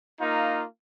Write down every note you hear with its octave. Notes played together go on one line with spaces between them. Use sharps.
A#3 D#4 F4